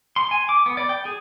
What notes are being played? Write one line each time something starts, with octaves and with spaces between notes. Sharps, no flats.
C6
G#5
D6
B3
D5
G5
G#4